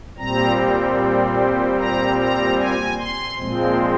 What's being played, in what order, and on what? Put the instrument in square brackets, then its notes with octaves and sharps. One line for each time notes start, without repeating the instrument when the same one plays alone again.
[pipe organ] A#2 G3 C4 A#5
A#5
A#5
G#5
C6
A#2 F3 G#3 C4